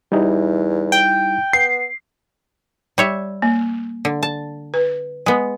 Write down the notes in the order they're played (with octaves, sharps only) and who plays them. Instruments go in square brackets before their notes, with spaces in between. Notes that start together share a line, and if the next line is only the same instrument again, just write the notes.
[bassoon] E2 [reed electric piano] G3 D#4 E4
[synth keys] G5
[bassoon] B3 [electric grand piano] C7
[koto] G3 C#5 E5
[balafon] A#3
[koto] D3
A5
[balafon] B4
[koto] G#3 B3